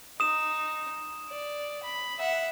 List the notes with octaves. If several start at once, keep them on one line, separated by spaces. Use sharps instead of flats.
D#4 D#6 E7
D5
B5
E5 F#5